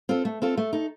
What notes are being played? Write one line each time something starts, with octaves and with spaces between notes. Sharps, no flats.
C4 F4 A4
A3
C4 F4 A4
A3
D#4 A4